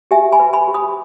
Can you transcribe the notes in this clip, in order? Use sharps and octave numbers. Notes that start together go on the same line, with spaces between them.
G4 E5 G#5
G#5 B5
B4
G#5 B5
G4
B5 D#6